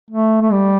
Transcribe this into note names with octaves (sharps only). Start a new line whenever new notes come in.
A3
A3
G3